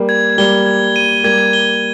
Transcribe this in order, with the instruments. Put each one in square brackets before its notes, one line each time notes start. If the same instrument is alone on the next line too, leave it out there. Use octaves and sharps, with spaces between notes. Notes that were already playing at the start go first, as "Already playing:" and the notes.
Already playing: [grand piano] G3 A#3
[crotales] G#6
[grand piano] G3 A#3 [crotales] G7
[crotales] G#6
D#7
[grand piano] G3 A#3 [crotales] G#6
[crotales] G7